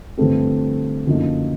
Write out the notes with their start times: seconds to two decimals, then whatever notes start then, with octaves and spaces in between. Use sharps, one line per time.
0.17 G2 D3 F3 A3 C4
1.07 F#2 D3 F3 A#3 D#4